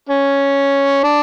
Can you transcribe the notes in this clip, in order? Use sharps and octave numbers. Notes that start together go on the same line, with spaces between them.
C#4
D4